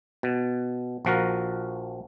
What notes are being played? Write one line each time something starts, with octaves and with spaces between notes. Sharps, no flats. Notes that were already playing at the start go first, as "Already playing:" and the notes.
B2
A#1 F3 F#4 A#4